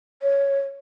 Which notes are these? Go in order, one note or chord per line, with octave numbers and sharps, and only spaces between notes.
C#5